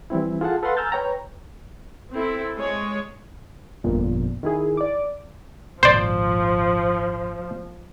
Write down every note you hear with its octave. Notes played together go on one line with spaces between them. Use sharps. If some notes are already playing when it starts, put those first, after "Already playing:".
E3 G3 C4 E4
F4 G#4 A4 F#5 A5
A4 B4 F5 F#5 C6
G#5 A#5 E6 F6 G6 A6
B4 C#5 G5 A#5
C4 E4 A4
G#3 G#4 C#5
G1 F2 A#2
D#3 E4 G#4
D5 D6
G#1 C#2 A#2 F3 C5 D5